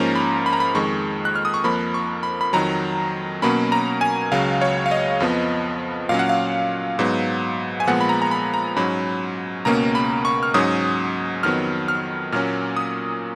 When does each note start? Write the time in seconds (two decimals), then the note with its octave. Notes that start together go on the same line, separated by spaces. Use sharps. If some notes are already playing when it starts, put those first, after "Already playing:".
Already playing: G#2 F3 A#3 C#4 A#5
0.15 B5
0.46 B5
0.53 A#5
0.60 B5
0.75 F2 D#3 G#3 C#6
1.25 F#6
1.36 F6
1.45 D#6
1.54 C#6
1.64 F2 F3 A#3 B5
1.94 C#6
2.23 B5
2.41 B5
2.53 F2 D#3 F#3 A#5
3.42 B2 F#3 A#3 C#4 B5
3.72 A#5
4.01 G#5
4.32 C#2 C#3 F#3 F5
4.61 C#5
4.86 F5
4.91 D#5
5.20 F2 F3 B3
6.09 A#2 F#3 C#4 F5
6.19 F#5
6.29 F5
6.99 G#2 F#3 B3
7.80 G#5
7.87 A#2 F3 G#3 B3 F#5
8.01 B5
8.09 A#5
8.22 A#5
8.31 B5
8.54 A#5
8.77 G#2 F#3 C#4 B5
9.65 C#2 B2 A#3 C#4 A#5
9.95 B5
10.25 C#6
10.43 F6
10.54 G#2 F#3 C#4 D#6
11.43 F2 D#3 F#3 B3 F6
11.88 F6
12.32 A#2 F#3 A#3 C#4 F6
12.77 D#6